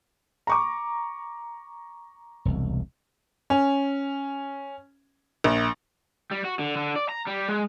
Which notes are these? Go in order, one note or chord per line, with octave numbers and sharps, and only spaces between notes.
A#5 C#6 D6
E1 C2
C#4
A#1
G3
F#4
D3
D3
D5
A#5
G3
G#3